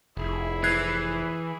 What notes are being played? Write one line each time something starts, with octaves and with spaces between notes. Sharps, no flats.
F1 E4 G#4
E3 F#6 G#6 C7